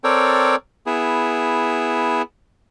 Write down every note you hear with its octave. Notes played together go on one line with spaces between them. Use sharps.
C4 A4 A#4 C#5 D5 G5
B3 E4 G#4